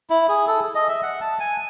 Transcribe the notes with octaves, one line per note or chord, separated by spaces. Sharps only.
E4
G#4
A4
D#5
E5
F#5
A5
G#5